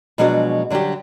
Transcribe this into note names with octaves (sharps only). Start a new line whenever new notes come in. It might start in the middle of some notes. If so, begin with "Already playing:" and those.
B2 F3 F#3 G#3 D4 F#4
D3 F#3 G3 D4 G4